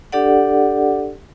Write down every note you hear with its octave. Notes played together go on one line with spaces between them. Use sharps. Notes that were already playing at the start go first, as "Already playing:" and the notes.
D4 G4 A4 D5 F#5